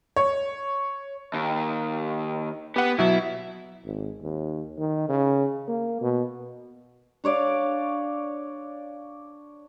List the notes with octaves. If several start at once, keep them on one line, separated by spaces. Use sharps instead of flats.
C#5
D#2
B3 G4 F#5
B2 F#3 E4
G#1
D#2
D#3
C#3
A#3
B2
D4 C#5 D5 F5